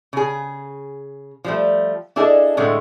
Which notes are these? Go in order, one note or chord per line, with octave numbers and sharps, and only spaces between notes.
C#3 G#4
F3 G3 A3
D4 E4 G#4 A4 D5 D#5
A2 D3 G#3 A3